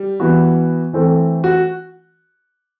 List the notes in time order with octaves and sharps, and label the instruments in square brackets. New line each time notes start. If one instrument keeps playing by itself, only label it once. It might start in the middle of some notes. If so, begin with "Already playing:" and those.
Already playing: [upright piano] G3
[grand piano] E3 B3 F#4
E3 A3 C4
[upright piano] F#4